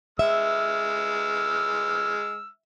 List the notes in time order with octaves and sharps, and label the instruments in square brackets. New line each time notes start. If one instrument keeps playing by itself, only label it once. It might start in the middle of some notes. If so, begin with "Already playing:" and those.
[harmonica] G#3 E6 F6 [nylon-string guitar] E5